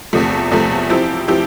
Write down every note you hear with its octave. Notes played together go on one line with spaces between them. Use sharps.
E2 C3 F3 A3
E2 C3 F3 A3
F3 C4 E4 G4
F3 C4 E4 G4